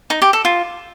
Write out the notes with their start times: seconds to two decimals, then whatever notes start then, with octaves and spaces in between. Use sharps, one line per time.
0.10 D#4
0.22 G4
0.33 A4
0.45 F4